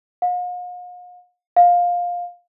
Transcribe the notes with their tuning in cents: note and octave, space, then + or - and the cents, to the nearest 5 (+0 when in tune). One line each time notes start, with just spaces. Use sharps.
F5 +45
F5 +15